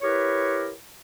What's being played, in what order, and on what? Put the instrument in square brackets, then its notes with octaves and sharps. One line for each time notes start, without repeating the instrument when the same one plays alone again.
[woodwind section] E4 G4 A#4 B4 C#5